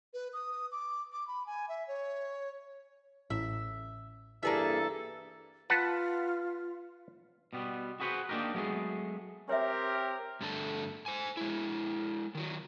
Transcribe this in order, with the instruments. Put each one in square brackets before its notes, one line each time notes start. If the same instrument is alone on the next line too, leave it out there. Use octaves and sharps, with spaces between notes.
[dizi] B4
D#6
D6
D6
B5
G#5
E5
C#5
[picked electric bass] A1 [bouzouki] E5
[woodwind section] G2 E3 A4 [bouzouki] A#3 G#4 E5
[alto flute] F4 [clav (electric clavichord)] B4 F#5 A5
[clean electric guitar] B2 G3 B3
F#4 G#4 B4 C5 F#5
A#3 D4 D#4 G4 A#4
F#3 G#3 A3 B3 G#4
[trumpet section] C4 G4 A#4 [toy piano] C#5 E5
[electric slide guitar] G2 D3 A3 A4
C5 G#5
G#3 E4
D#3 F#3